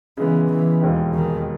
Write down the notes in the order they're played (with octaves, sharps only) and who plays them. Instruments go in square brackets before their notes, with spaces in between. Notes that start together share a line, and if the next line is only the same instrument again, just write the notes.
[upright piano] C#3 G#3 B3 [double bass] E3
[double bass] E3
[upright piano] E1 D#2 D#3 G#3
[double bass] D#3